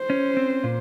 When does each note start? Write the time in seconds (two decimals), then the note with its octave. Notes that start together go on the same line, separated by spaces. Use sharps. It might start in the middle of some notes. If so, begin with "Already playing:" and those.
Already playing: C5
0.10 C#4
0.37 C4
0.64 A#2